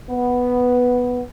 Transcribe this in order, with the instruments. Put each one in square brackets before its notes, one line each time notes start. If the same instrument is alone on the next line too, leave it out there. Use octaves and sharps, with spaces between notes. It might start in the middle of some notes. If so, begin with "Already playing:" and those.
[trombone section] B3